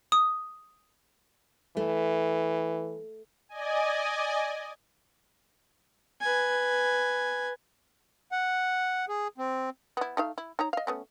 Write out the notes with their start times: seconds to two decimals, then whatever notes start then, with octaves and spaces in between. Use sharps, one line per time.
0.12 D#6
1.77 E3 A3
3.49 D5 D#5 G#5
6.21 B4 G#5
8.32 F#5
9.09 G#4
9.38 C4
9.97 B3 E4
10.17 A3 D#4 F5
10.38 E4
10.59 D#4 C#5 A#5
10.73 D#5 F5
10.87 A3 B3 C#4